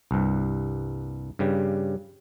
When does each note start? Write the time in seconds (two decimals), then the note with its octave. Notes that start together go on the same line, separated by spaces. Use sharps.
0.11 C2 G2
1.39 G2 C#3 G3